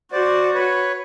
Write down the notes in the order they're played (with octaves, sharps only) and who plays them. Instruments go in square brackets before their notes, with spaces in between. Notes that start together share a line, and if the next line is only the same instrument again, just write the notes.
[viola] F#4 [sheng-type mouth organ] C5 D5
[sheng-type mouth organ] B4 C#5